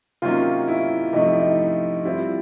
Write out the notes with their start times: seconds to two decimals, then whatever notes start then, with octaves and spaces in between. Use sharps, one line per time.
0.22 C3 D#3 F#3 A#3 C#4 F4
0.68 E4
1.13 C3 F3 A3 D#4
1.27 E4
1.39 D#4
2.05 G3 C4 E4 F4